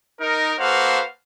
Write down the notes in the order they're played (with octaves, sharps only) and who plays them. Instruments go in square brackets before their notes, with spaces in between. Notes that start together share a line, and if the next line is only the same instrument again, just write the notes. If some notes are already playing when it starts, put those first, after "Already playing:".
[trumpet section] D#4 A#4
A#3 F#4 A4 B4 C5 F5